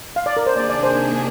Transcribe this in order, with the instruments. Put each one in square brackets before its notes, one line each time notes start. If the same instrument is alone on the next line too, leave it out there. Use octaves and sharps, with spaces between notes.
[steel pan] F5
D5
A#4
C5
[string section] C3 D#3 A#3 D4 G#4 [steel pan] D5
[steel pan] D5
C5